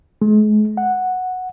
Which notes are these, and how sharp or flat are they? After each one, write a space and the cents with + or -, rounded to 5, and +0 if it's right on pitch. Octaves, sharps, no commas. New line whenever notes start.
G#3 +40
F#5 -5